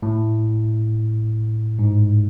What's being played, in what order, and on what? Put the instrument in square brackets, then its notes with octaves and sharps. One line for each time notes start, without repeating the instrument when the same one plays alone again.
[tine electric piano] A2
G#2